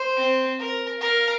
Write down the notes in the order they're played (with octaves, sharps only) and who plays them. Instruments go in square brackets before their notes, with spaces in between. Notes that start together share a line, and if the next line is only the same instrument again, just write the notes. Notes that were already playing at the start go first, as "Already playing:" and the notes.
Already playing: [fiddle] C5
[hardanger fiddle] C4
A#4
[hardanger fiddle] A#4 [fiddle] F5